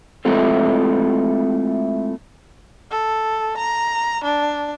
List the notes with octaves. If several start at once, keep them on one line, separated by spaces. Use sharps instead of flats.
G#3 A3 C4 E4 F4 A4
A4
A#5
D4